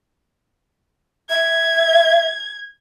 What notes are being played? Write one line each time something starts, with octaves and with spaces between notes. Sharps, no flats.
E5 G#6